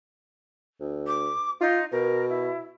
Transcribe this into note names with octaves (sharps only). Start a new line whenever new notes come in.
D2
D6
D#4 F4
B2 A#4
E4